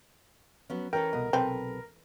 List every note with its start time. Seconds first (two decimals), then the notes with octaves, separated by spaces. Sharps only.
0.70 F#3 B3 C#4
0.93 E3 C#4 A4 A#4 G5
1.13 C2 B2 D#5
1.33 B1 C3 C4 A4 B4